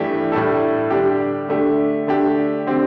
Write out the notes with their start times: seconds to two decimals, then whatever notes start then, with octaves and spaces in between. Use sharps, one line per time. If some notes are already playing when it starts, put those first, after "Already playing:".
Already playing: G2 E3 A3 D4 G4
0.32 A2 G3 D4 A4
0.91 D3 G3 D4 G4
1.49 D3 A3 D4 G4
2.07 D3 A3 D4 G4
2.67 D3 C4 G4